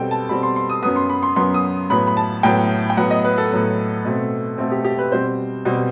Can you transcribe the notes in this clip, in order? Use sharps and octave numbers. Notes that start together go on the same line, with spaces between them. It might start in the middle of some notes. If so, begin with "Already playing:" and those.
Already playing: B2 G3 C4 A4 G5
A5
B2 G3 C4 B5
C6
C6
D#6
F#2 F#3 B3 D#6
C6
B5
C6
F#2 F#3 B3 C6
D#6
A2 F#3 B3 B5
B5
A5
A2 F#3 B3 G5
G5
A2 F#3 B3 F#5
D#5
B4
A4
A2 F#3 B3
B2 A3 C4
B2 A3 C4
G4
G4
B4
B2 G3 C4 C5
B2 G3 C4